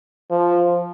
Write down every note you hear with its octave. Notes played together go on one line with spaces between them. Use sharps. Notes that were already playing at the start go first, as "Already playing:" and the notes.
F3